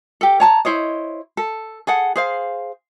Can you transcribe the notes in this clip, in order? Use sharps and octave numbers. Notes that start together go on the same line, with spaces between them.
G4 A4
C#5 A5 A#5
E4 C5 C#5 D#5
A4
G#4 A4 F#5
G#4 C5 F5